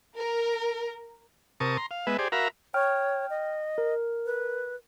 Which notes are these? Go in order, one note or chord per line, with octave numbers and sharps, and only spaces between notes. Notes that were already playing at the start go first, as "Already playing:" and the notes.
A#4
C3 A#4 A5 C#6 D#6
A#5 C6
F5
G#3 B3 B4 E5
G4 G#4 C5 D5
F#4 A#4 E5 F5 A#5 B5
C#5 G5 F6
D#5
A#4
B4